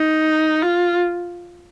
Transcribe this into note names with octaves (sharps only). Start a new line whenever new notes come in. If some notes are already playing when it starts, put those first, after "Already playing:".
Already playing: D#4
F4